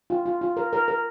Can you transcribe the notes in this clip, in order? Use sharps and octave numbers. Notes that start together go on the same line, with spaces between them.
F4
F4
F4
A#4
A#4
A#4